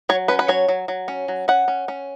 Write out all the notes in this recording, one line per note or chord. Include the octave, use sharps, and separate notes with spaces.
F#3 C#5
C#4 B4
B4
F#3 C#5
F#3
F#3
C#4
F#3
C#4 F#5
C#4
C#4